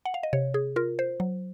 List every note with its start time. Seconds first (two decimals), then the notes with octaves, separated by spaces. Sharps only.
0.05 F#5
0.14 F5
0.23 D#5
0.33 C3 C#5
0.54 G#4
0.76 F4 A#4
0.99 C5
1.20 F#3